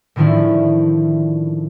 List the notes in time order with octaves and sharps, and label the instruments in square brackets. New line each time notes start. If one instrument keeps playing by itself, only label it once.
[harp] A2 D3 D#3 F3 C#4 E4